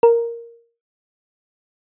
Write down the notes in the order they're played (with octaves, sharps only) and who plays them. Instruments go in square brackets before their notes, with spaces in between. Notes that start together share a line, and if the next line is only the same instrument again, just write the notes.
[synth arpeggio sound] A#4